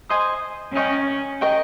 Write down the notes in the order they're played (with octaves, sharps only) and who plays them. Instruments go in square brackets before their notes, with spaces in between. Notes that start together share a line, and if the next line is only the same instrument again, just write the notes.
[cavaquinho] C5 D#5 G#5 D#6
[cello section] C#4 [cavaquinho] A#4 D#5 G5 C#6
[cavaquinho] A#4 D#5 G5 C#6